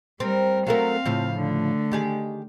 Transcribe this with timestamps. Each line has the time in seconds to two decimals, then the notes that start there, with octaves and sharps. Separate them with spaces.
0.20 G3 C4 A#4
0.67 F#3 A3 C4 A#4 F5
1.06 A2 C#3 F3
1.36 D3 A3
1.92 D#3 G4 G#4